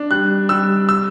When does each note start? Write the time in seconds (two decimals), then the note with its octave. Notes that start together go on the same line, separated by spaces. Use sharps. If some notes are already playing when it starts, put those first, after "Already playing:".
Already playing: D4
0.11 G3 F#6
0.49 G3 E6
0.89 E6